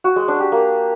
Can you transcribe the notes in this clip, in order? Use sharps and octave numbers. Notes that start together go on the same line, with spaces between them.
F#4
G#3
D4
G4
A#3